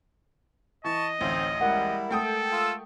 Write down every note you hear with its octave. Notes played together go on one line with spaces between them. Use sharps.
E3 D#5 A5 C#6
A1 D2 C4 D#4
G3 G#3 E4 A#4 F#5
A3 A4 G5 D#6
F4 E6